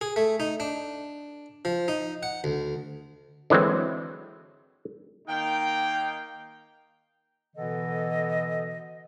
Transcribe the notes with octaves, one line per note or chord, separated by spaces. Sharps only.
G#4
A3
D#4
D4
F3
D#4
F#5
D2
D3 E3 F#3 G#3 C4
D#3 A#3 D#4 F5 G5
B2 D3 E3 B3 A4 D#5